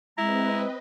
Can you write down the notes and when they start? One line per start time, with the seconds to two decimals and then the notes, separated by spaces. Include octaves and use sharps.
0.18 G#3 C4 E4 B4 D#5 A#5